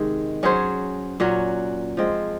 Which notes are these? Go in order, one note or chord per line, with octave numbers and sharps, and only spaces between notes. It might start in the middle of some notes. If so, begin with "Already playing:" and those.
Already playing: C3 D#3 G#3
F#3 C#4 G#4 C5
A#2 F#3 C#4 F#4
F3 G#3 C4